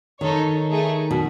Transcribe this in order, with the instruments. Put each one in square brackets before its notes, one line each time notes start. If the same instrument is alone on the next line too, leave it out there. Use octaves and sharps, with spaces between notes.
[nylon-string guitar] D#3 [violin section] D#4 A4 C#5
[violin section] A3 D#4 G#4
[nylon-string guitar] B2